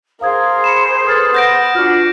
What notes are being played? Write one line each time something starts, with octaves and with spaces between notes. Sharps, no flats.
G#4 A#4 C5 F5 D#6 G#6
B5 C#7 E7
A4 B4 D#6 F6 A6
B3 G6 A#6 D7
D4 F4 F#4 F6